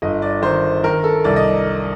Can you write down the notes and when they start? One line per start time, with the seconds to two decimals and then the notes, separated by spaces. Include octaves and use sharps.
0.02 G1 D#5
0.22 D5
0.42 D#3 C5
0.84 D#3 A#4
1.04 A4
1.24 C2 D5
1.36 D#5